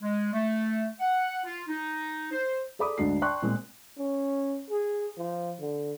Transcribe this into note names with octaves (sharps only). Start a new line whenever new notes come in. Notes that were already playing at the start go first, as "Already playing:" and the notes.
G#3
A3
F#5
F4
D#4
C5
G#4 A4 D5 B5 D6 D#6
D2 G#2 D4 D#4 F#4 C7
D5 G5 A5 C6 C#6 F#6
A#2 G#3 C4
C#4
G#4
F3
D3